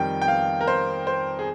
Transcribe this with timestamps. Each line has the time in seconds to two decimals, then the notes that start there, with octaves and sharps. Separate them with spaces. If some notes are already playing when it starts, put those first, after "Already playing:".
Already playing: F2 D#3 G3 G5
0.22 G5
0.28 F5
0.61 A#4
0.67 C5
1.07 C5
1.39 G#4